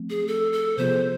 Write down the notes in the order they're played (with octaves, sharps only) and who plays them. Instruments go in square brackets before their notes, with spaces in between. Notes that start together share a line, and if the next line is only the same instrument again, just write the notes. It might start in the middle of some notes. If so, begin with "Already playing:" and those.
Already playing: [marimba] F3 A3 C4
[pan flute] G#4
A4
A4
[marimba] C3 F3 B3 F4 G#4 [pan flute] C5